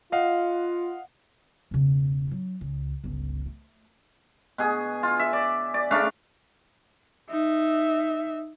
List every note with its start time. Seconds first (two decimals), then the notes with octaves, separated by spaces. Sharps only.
0.12 F4 D#5 F5 F#5
1.71 E1 C#3
2.27 F#3 D4
2.61 C#2
3.04 G1 C#2
3.46 A3
4.58 B2 G#4
5.03 F4
5.19 E5
5.33 D5
5.74 D5
5.91 C#3 A3 D4 F5
7.29 D#4 E5